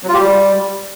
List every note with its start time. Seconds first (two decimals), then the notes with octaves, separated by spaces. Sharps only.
0.03 F#3
0.09 F4
0.14 G4
0.19 G3